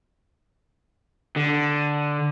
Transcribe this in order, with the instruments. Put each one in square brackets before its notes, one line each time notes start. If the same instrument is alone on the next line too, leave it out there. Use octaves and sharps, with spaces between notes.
[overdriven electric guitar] D3